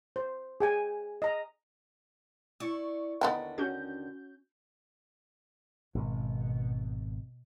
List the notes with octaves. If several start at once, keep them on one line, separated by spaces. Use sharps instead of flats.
C5
G#4 G5 G#5
D#5 A#5
E4 D5 C#6
D#2 D3 B3 D#4 G5
C#4 F#4 G6
G#1 B2